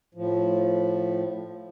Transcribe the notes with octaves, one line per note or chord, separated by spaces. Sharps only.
A2 F3